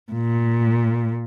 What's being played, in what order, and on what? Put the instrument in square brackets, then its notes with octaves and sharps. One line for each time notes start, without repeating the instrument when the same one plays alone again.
[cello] A#2